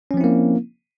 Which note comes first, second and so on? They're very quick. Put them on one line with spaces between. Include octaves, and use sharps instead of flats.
C#4 F3 C4 E4 A#3